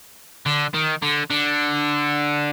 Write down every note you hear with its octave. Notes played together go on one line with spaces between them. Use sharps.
D3
D#3
D3
D3